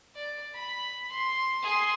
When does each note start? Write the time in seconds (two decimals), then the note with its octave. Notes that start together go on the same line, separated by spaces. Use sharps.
0.15 D5
0.54 B5
1.11 C6
1.63 G#4 C6